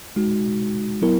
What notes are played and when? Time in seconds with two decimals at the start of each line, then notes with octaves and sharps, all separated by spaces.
0.16 G#3 D#4 F#4
1.02 F#3 B3 E4 A#4